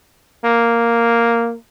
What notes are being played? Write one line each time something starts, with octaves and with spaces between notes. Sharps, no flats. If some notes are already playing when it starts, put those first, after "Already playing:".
A#3